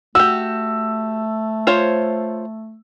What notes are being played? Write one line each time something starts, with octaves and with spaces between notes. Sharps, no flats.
A3 F#4 G4 E6
F4 C5 C#5